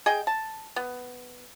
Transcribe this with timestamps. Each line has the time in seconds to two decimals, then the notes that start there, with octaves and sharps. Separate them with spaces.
0.06 G#4 D#5 G5
0.27 A5
0.76 B3